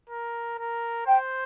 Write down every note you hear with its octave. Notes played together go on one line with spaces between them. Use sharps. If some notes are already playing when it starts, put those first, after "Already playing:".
A#4
A#4
C5 G5